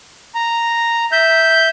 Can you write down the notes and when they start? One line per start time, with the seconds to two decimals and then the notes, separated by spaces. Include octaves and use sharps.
0.35 A#5
1.12 E5 G6